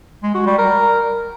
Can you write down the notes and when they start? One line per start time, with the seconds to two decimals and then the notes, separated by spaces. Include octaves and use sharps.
0.23 G#3
0.35 F#4
0.47 G3
0.58 A#4